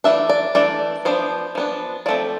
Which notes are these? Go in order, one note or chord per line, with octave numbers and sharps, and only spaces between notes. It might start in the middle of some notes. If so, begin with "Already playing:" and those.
E3 A3 D4 E5
D5
E3 A3 D4 D5
F3 B3 D4 C5
F3 B3 D4
F3 A3 C4 D5